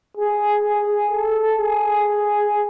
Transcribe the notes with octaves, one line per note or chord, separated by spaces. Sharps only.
G#4
G#4
A4
G#4